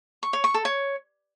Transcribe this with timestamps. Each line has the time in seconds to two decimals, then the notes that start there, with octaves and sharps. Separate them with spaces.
0.23 C#6
0.33 C#5
0.44 C#6
0.54 A4
0.65 C#5